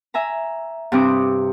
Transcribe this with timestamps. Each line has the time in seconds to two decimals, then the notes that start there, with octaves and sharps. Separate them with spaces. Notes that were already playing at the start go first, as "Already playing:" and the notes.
0.14 E5 G#5 A#5
0.92 G2 C3 G3 C4 D6 D#6